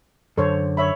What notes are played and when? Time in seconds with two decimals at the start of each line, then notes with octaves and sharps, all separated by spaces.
0.38 F#2 D3 A4 C5 C#5
0.77 C#5 E5 B5